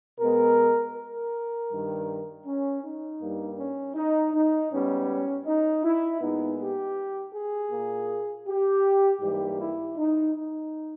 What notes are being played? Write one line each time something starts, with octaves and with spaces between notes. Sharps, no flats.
B2 G#3 B3 A#4
A#4
G2 D#3 G3
C#4
D#4
G2 G3 A#3
C#4
D#4
D#4
G#2 G3 B3 C#4
D#4
E4
A#2 G#3 B3 D#4
G4
G#4
A#2 A#3
G4
G#2 E3 G3 A#3 G4
E4
D#4
D#4